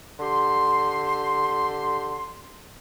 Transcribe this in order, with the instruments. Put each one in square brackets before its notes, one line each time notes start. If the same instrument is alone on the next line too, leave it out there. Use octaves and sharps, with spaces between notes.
[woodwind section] D3 G4 C6